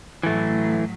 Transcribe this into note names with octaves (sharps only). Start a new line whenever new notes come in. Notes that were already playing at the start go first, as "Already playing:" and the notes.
A2 E3 F#3 A3